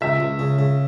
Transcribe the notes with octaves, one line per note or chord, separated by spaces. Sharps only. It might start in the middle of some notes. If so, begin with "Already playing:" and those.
C#2 E5
C#2
C#3
C#3